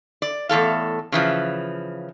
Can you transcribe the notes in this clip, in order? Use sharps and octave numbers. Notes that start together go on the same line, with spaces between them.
D5
E2 A2 A4 F5
C#3 E3 F3